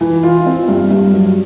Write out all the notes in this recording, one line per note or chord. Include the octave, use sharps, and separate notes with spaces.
E3
F4
C4
G2
G2
F#3